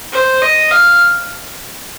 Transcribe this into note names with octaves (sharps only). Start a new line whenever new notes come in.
C5
D#5
F5